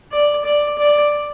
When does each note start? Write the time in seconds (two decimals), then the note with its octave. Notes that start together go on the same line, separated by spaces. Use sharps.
0.12 D5
0.44 D5
0.78 D5